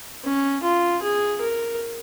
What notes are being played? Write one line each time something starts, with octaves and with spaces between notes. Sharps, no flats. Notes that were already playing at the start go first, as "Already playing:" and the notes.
C#4
F4
G#4
A#4